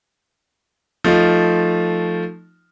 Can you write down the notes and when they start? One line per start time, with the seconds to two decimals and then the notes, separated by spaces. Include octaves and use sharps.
1.04 F3 A3 D#4 F4